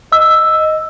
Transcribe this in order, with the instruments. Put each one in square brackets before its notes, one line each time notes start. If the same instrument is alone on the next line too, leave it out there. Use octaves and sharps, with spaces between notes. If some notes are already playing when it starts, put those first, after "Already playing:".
[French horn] D#5 [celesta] E6